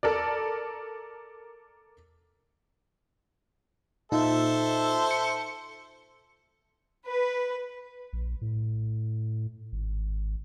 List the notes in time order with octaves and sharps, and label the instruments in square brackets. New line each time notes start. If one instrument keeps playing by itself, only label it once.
[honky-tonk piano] A4 A#4 D5
[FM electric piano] A#2 D#4 F4 [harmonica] A4 C5 E5
[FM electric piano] C#7
[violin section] B4
[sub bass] A#1
A2
G#1